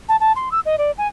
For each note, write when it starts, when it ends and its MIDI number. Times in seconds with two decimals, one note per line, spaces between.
0.09 0.16 81
0.20 0.32 81
0.36 0.49 84
0.52 0.60 88
0.65 0.76 75
0.78 0.91 74
0.98 1.08 80